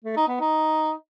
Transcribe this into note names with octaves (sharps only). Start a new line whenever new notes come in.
A3
D#4
B3
D#4